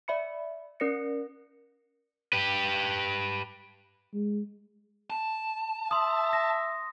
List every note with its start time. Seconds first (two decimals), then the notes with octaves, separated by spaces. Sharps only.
0.08 D5 E5 B5 C#7
0.80 C#4 A#4 D5 A#6 C#7
2.33 G4 B4
4.13 G#3
5.10 A5
5.91 E5 C6 D#6
6.33 A#6